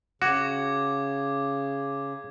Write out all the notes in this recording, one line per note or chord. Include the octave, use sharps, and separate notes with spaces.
C#3 F#4 D6 G#6